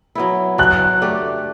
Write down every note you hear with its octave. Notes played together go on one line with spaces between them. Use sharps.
F#3 B3 E4
F#3 F#6
A3 D4 G4